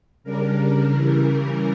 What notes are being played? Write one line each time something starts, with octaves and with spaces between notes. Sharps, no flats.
C#3 G3 D4 A#4
C#3 E3 G3